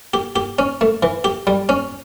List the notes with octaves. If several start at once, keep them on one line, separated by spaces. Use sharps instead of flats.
G4
G4
C#4
A3
E3
G4
G3
C#4